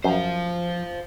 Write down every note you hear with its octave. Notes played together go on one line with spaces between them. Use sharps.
F#2 F3 C5 F5